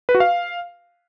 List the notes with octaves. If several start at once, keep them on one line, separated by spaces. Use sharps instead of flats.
B4
F#4
F5